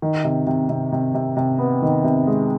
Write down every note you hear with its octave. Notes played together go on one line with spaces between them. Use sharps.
D#3
C3
C3
C3
C3
C3
C3
B3
D#3
C3
G#3